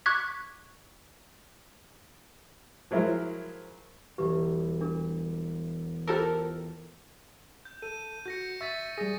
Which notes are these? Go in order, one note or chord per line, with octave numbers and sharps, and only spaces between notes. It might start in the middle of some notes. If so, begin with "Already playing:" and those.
C#6 D6 F#6 G#6 B6
F3 F#3 G#3 E4 A#4 C5
E1 E3 G3 G4 B4
D4 A#4
F4 G4 A4 A#4 C5 E6
G6
A4 D#7
F#4 G6 A#6 C#7
E5 C#6 A6 B6
G3 G#4 A#6